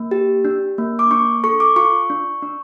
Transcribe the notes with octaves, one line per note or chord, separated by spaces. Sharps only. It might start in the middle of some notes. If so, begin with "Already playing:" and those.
Already playing: A#3
G4
D4
A#3
D6
D4 C#6
A4 C#6
D6
F4 C#6
D4
D4